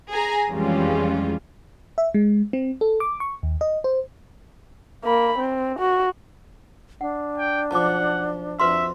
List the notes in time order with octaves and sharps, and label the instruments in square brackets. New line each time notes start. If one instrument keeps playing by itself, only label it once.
[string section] G#4 G#5 A#5
F2 E3 G3 G#3 C#4 F4
[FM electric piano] E5
G#3
C4
A4
D6
C#6
D#2
D#5
C5
[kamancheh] A#3 B5
C4
F#4
[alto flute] D4 [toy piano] F#5
[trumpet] G5
[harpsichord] B1 F3 [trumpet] F#5 [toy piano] A5 D6
[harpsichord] F2 F#4 [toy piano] B4 C6 [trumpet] E5